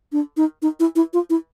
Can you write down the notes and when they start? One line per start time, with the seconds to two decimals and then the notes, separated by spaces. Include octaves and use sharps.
0.12 D4
0.37 D#4
0.62 D#4
0.80 E4
0.96 E4
1.13 F4
1.30 E4